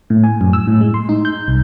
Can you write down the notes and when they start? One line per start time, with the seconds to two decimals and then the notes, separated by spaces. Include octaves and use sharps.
0.10 A2
0.24 G#5
0.41 F#2
0.53 E6
0.67 A2
0.81 G#3
0.94 C6
1.09 D#4
1.25 G6
1.48 C2